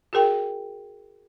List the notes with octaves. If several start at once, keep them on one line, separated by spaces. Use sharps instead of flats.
F#4 G#4 A#4 G5